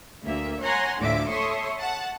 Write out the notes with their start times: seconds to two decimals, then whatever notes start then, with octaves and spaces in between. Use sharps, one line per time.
0.23 D2 A#3 E5
0.62 C#5 F#5 G#5 A#5 C6
1.00 D2 A2 D3 F3 E5 D6
1.29 A4 C#5 E5 C6 C#6 D#6
1.79 F#5 A5